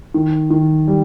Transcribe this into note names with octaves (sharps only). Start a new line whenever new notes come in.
D#3
D#3
G3